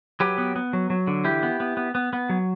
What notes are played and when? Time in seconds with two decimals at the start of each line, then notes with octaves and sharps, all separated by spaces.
0.20 F#3 G4 B4
0.38 B3
0.56 B3
0.73 F#3
0.90 F#3
1.07 D3
1.25 E3 E4 G4
1.43 B3
1.60 B3
1.77 B3
1.95 B3
2.13 B3
2.29 F#3